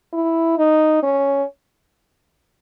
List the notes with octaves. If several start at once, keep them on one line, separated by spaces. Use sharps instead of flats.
E4
D#4
C#4